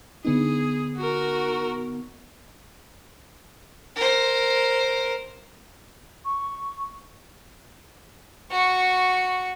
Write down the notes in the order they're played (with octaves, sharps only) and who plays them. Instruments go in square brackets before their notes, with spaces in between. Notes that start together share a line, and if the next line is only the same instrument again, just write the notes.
[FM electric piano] D3 B3 D#4 [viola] G#4
[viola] F#4 A#4
[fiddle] A#4 C5
[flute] C#6
[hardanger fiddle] F#4 C#6